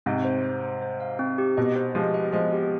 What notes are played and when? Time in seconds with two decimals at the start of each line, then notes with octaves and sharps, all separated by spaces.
0.06 G#2 C3 C4
0.25 C5
0.44 C5
0.64 C5
0.82 C5
1.00 F5
1.19 C4
1.38 G4
1.57 B2 D#5
1.76 C5
1.95 F3 G#3 G4
2.14 D#5
2.32 F3 G#3 D#5
2.52 G4